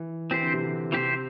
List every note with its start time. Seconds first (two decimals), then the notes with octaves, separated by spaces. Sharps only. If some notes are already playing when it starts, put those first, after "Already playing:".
Already playing: E3
0.31 E3 C4 G4 C5
0.42 D3
0.54 C3
0.63 D3
0.92 C3 E3 C4 G4 C5